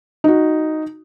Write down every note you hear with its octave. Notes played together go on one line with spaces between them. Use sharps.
D#4 F#4